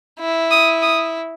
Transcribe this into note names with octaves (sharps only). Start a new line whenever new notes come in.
E4
D#6
D#6